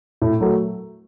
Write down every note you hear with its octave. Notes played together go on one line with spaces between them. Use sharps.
A2
F#3 A3